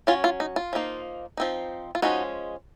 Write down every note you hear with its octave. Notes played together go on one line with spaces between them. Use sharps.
F#3 C#4 F4
F4
D#4
F4
F3 A#3 D#4
F3 C4 D#4
F4
F3 G#3 C#4 D#4 F#4